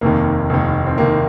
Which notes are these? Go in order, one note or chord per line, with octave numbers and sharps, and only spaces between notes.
F1 D#2 D#3 A#3
F1 D#2 D#3
C4
F1 D#2 D#3 A#3